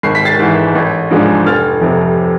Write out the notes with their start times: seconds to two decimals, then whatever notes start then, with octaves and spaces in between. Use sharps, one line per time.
0.03 G#1 C7
0.15 B6
0.25 A6 C7
0.39 G#2 E3
0.75 A1
1.11 G#2 F3 G#3 D4
1.46 F1 F6 A6
1.81 F2 C3